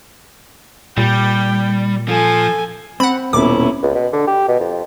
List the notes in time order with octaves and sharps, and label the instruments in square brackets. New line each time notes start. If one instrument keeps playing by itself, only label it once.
[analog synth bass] A#2 [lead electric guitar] G3 [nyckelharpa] G5
[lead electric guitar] F3 [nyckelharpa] A4 G#5
[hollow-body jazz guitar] C4 [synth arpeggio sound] F#5 B5
[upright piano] D#1 [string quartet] B2 C#4 E4 [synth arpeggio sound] D6
[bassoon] C#2
B2
D3
G4
B2
F2